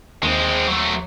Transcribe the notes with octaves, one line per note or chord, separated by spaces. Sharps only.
D#2 G#3 C4
F#3 A3